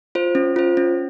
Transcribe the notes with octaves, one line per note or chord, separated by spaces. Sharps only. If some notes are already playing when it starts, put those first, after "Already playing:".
F4 C5
C#4
F4 C5
C#4